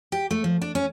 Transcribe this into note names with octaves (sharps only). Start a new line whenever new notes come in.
G4
A3
F3
D4
C#4